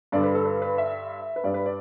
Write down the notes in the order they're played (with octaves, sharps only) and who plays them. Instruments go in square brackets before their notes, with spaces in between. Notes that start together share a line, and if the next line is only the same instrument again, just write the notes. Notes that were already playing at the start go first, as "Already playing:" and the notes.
[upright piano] G2 D3 G3 D5
B4
A4
B4
B4
E5
B4
G2 G3 D5
B4
D5